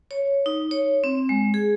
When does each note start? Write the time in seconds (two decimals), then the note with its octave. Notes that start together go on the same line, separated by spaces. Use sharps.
0.11 C#5
0.46 D#4
0.71 C#5
1.04 C4
1.29 G#3
1.54 G#4